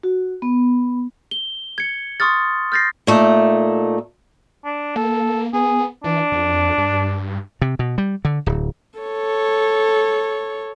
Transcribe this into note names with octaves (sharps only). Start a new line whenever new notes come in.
F#4
B3
G7
G#6 C#7
C6 C#6 D#6 F6 A6
F6 G6 A6 A#6 C7
A#2 A3 D#4
D4
A#3 A4
B3 G#4
E3 D4
F2
G2
C3
B2
G3
D3
D1
A4 C#5